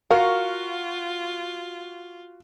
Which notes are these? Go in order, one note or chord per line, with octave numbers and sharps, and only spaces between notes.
F4 F#4 A#4 F5 C#6 F6